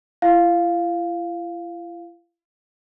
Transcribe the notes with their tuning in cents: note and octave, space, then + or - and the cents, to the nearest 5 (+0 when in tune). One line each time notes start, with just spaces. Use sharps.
E4 +45 F5 +0